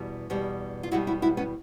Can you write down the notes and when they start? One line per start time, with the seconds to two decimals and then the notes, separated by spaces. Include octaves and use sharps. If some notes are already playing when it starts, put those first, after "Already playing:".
Already playing: E2 B2 G3
0.30 E2 B2 G3
0.83 F4
0.91 E2 B2 G3 E4 F#4
1.07 E4 F#4
1.22 E4 F#4
1.37 B3 C#4